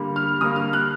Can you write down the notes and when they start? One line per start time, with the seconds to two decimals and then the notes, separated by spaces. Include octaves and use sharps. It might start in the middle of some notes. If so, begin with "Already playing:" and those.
Already playing: D3 G3 A#3
0.16 F6
0.41 D3 G3 A#3 D#6
0.56 F6
0.73 F#6